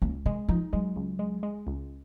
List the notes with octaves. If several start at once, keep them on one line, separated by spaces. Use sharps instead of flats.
C#2 A#3
D#3 G#3
F3 D#4
F#3 G#3
C#2
G#3
G#3
C#2